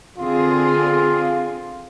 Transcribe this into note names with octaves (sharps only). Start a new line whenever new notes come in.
D3 C4 F4 G#4